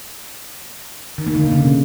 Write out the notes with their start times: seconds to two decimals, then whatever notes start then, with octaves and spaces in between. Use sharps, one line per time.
1.18 D#3
1.27 A#3
1.35 D3
1.44 B2
1.52 C#3